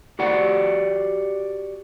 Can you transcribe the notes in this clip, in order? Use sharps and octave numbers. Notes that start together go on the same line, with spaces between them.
F#4 G4 D5 F#5